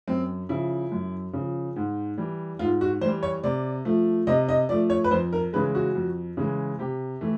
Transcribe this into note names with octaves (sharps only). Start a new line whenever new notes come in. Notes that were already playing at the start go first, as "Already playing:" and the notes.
F#2 C4
C#3 F3 E4
F#2
C#3
F3
G#2
E3 G3
G#2 F4
F#4
E3 G3 C5
C#5
C3 D5
F3 A3
C3 D#5
D#5
F3 A3 D5
C#5
B4
F2 C5
A#4
C#3 E3 G#3 B4
F#4
F2
C#3 E3 G#3
C3 G4
E3 A3